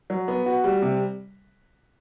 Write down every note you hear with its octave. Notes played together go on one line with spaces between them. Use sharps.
F#3
B3
F#4
G3
C3